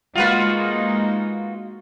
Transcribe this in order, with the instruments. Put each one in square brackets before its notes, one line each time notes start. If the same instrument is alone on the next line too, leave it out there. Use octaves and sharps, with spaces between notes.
[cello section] G#3 A#3 D#4 [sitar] F4 F#4 B4